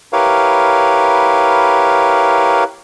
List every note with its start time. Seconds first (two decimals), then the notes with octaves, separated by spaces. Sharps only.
0.13 E4 G4 A#4 B4 C#5 F5